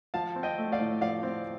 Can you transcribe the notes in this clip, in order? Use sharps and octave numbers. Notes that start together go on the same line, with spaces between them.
F3 F5 A5
C4
D#5 G5
A3
D5 F5
A2
F3 D5 F5
C4